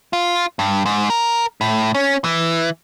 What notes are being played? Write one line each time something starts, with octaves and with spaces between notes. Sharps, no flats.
F4
G2
G#2
A#4
A2
C#4
E3